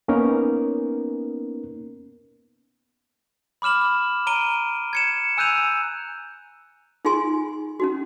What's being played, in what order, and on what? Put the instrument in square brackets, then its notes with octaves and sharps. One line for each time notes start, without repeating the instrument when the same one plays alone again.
[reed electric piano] A#3 B3 C#4 D#4 A#4
[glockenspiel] B5 D6 F6 E7 F#7
A#5 D7 D#7 G7
G#6 C#7 E7
G#5 E6 F#6 G6 D#7 F7
[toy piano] D#4 F4 G#4 G#5 C6
C#4 D#4 F#4